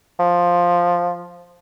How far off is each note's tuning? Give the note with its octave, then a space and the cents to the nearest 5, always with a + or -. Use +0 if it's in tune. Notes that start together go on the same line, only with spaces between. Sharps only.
F3 +5